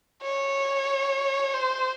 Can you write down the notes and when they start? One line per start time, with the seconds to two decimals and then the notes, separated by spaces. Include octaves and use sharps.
0.22 C#5
1.53 C5